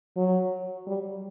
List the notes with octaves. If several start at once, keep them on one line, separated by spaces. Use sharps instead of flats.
F#3
G3